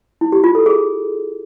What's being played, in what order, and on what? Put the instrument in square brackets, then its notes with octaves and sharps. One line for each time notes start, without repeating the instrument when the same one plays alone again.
[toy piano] E4
G4
F4
A4
G#4